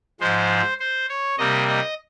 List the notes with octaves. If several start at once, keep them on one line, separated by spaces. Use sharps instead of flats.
G#2 F3 G#3 C5
C5
C#5
C3 G3 A#3 D#5
D#5